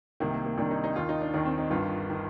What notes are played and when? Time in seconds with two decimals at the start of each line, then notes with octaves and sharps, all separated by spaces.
0.20 C2 C3 D#3 A#3
0.34 A#3
0.45 A#3
0.58 C2 C3 D#3 D4
0.71 D#4
0.84 D#4
0.96 D#2 D#3 F4
1.09 D#4
1.21 D4
1.34 D#2 D#3 D4
1.45 C4
1.58 D#4
1.70 G1 G2 D#3 F4
2.10 D#3